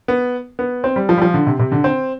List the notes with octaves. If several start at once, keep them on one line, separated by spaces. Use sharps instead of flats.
B3
B3
C4
G3
F3
G3
F3
D3
C3
C3
D3
C4